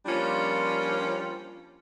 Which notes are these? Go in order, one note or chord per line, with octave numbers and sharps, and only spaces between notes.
F3 G3 A#3 C#4 D4 F4